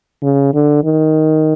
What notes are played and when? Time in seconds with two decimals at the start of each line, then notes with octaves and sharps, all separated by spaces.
0.23 C#3
0.54 D3
0.84 D#3